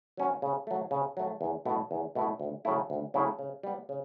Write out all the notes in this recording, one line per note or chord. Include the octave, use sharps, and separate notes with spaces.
F#3 C#4 F#4
C#3
F#3 A3
C#3
F#3 A3
E2
B2 A3 E4
E2
B2 A3 E4
D2
C#3 F#3 A3 E4
D2
C#3 F#3 A3 E4
C#3
G3 B3
C#3